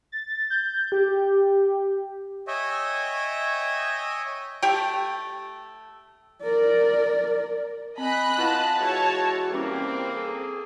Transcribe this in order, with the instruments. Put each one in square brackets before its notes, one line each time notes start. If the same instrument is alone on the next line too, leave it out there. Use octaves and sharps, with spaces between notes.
[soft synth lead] A6
G6
G4
[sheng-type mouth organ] C#5 D#5 E5 G5 G#5
[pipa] A3 G4 G5
[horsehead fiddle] A#4 D5
[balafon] C4 [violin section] D#5 B5 F#6 [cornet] G#5
[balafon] E4 B4 F#5 [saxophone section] F4 [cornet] A5
[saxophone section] E3 G#3 F#4 [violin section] C#5
[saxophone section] E3 G3 [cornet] A#3 [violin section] C4 [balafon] C#4 E4
[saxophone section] G#4 A4